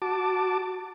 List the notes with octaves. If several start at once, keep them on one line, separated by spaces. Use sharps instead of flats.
F#4 A5 D6